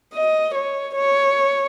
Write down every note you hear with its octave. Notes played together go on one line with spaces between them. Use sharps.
D#5
C#5
C#5